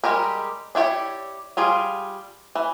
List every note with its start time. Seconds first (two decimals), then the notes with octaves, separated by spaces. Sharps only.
0.04 G3 G#3 G4 A#4
0.75 D4 E4 G4 C#5 D5
1.57 G3 F4 G#4 D5
2.55 E3